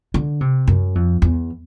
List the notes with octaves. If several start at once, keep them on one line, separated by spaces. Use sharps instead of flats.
D3
C3
F#2
F2
E2